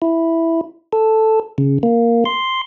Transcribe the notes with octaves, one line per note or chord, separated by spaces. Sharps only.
E4
A4
C#3
A#3
C6